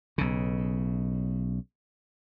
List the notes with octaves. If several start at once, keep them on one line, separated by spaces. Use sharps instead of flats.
B1 C#3